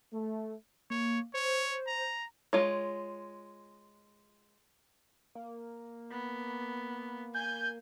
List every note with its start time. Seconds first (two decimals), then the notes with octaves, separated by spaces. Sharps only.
0.13 A3
0.90 A#3 C#5
1.34 C5 C#5
1.87 A#5
2.53 G#3 F4 C#5
5.35 A#3
6.12 B3
7.35 G#5 G6